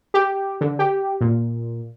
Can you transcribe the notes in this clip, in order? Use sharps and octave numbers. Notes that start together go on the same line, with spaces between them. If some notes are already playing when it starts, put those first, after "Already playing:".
G4
D3
G4
A#2